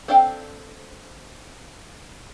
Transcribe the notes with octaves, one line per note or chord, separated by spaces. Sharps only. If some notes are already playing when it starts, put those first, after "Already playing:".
C4 D4 A4 F5 G5